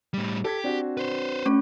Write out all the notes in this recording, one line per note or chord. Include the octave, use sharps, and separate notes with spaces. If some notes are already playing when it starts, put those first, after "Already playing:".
A2 G3
G4 A4 G#6 B6
C4 D4 F#4
B4 C5
A3 C#4 C#6